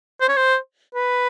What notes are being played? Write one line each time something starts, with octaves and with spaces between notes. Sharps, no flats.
C5
C#5
C5
B4